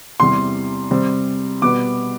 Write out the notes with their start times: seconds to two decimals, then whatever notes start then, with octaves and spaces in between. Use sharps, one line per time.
0.20 E2 C3 G3 C6
0.91 C3 G3 C4
1.62 B2 G3 B3 D6